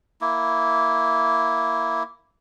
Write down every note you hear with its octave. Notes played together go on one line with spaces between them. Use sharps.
A#3 E4